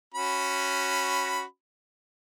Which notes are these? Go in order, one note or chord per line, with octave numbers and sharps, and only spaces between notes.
C#4 F#4 B5